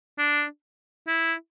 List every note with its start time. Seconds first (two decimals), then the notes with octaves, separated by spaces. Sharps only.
0.18 D4
1.07 E4